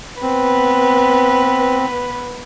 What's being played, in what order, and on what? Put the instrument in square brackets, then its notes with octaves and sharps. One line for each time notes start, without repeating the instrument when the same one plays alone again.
[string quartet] B3 B4 [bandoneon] C4